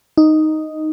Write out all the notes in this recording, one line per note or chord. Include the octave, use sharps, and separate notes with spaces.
D#4